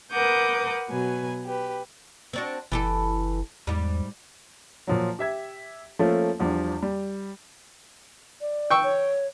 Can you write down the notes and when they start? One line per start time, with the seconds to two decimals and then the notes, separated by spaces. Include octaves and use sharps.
0.11 A#4 B4 F#5 D6 D#6 G6
0.88 B2 F#3 B4 G#5
1.44 G4 B4
2.33 C4 D4 F#4
2.72 F#1 E3 G4 A4
3.67 E2 G#2 G3
4.87 A#2 F3 F#3
5.19 G4 E5 G#6
5.99 F3 A3 A#3 C#4 F4 A4
6.39 E2 F3 G3 D4
6.82 G3
8.41 D5
8.70 G5 C#6 E6
8.83 C#5